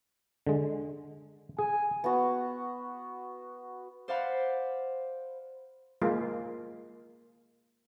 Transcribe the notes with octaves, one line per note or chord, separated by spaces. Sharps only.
D3 G#3
G#4 G#5
B3 F#4
C5 D5 F5 F#5 B5
G#3 A#3 F4